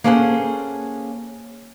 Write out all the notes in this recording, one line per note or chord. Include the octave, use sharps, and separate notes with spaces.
A#3 C#4 G#4 A4 C5 F#5